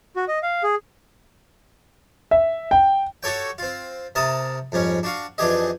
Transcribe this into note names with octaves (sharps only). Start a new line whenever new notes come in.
F#4
D#5
F5
G#4
E5
G5
F#4 G4 A4 C#5 G5
C4 F4
C3 A#4 A5 D#6
F2 G#2 G3 C#4
D4 F#4 F5
F2 E3 D4 G4 G#4 D#5